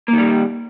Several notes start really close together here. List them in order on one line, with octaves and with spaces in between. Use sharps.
A#3 D#3 G3